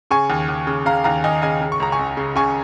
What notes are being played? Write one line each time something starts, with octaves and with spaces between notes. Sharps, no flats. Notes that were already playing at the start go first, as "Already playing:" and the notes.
C#3 G#5 C#6
D#2
D#2
C#3
C#3 F5 A#5
D#2 F5 A#5
D#2 D#5 G#5
C#3 D#5 G#5
C#3
C#6
C#2 A#5
G#5 C#6
C#2
C#3
C#3 G#5 C#6